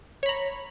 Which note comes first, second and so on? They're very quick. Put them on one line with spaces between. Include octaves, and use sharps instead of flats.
C#5 B5 A#5